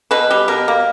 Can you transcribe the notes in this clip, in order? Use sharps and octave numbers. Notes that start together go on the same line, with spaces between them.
B2 B4
G3
B2 A#4
A#3